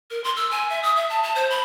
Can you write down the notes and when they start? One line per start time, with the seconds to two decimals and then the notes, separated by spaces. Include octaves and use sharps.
0.11 A#4
0.24 C6
0.36 E6
0.51 G#5
0.70 E5
0.83 D#6
0.97 E5
1.09 A5
1.23 A5
1.35 C5
1.50 B5